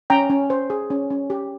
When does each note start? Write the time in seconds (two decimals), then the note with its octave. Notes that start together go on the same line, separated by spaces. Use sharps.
0.10 C#4 G5 A#5
0.30 C#4
0.50 C5
0.70 G#4
0.90 C#4
1.10 C#4
1.30 G4